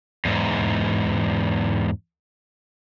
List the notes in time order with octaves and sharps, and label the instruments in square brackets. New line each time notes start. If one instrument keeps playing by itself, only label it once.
[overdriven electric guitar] E2 G#2